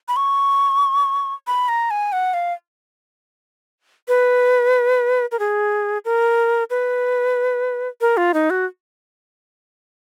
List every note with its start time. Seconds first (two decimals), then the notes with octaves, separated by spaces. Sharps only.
0.08 B5
0.16 C#6
1.47 B5
1.69 A#5
1.91 G#5
2.13 F#5
2.34 F5
4.08 B4
5.32 A#4
5.39 G#4
6.05 A#4
6.70 B4
8.01 A#4
8.17 F4
8.34 D#4
8.50 F#4